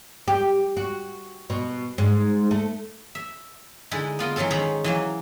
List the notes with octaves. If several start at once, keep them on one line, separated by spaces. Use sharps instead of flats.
G4
F#4
B2
G#2
A3
E5
D3 G#3 D#4 E4
B3 F4 A#4 D#5
E3 F#3 G#3 C#4 A4
D#3 C#4 G#4 C5 A#5 B5
E3 F#3 A#3